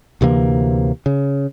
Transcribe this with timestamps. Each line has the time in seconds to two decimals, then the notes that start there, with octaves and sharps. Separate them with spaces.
0.21 D2 C3 E3 A#3
1.06 C#3